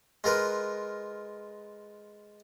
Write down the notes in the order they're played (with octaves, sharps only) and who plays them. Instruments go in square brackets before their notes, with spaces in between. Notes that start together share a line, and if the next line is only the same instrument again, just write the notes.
[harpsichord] G#3 F4 A#4 B4